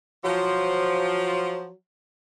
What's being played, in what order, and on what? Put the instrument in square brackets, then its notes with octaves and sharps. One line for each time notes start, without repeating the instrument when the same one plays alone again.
[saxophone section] F3 [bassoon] F#3